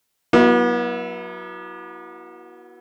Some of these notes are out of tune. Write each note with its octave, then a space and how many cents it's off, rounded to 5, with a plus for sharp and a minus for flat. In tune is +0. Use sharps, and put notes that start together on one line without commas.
F#3 +0 B3 -40 E4 +0